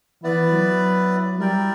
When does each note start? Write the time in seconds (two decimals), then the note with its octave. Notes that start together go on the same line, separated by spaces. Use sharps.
0.23 E3 B3 E4 B4 D5
0.52 F#3
1.39 G3 E4 A#4 D5 G5